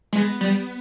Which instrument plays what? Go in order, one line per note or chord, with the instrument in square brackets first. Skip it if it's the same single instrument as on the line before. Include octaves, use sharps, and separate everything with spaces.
[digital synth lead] G#3 [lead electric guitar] B3
[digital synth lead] G3